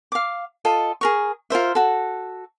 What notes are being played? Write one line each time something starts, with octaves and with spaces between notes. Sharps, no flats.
F5 D6
F4 A4 D#5
G#4 A#4 C#6
F4 A#4 C5 E5
F#4 A4